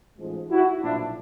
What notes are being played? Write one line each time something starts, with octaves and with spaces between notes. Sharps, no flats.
A1 G#2 F3 G#3
E4 F#4
B1 A#2 F3 D4 E4